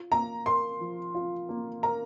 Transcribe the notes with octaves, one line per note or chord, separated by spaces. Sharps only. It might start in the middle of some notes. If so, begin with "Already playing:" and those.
Already playing: F4
A#3 A#5
A#4 C6
F3
F4
A#3
A#4 A#5